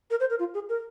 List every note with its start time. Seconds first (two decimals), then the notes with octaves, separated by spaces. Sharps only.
0.10 A#4
0.20 C5
0.30 A#4
0.39 F4
0.54 G#4
0.69 A#4